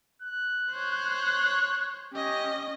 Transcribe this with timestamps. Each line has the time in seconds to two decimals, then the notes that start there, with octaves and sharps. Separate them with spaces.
0.22 F#6
0.71 C5 C#5
2.13 C#4 G4 D#5